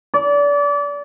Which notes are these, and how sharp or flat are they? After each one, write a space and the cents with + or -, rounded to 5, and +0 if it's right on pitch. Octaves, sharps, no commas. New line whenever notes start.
D5 -30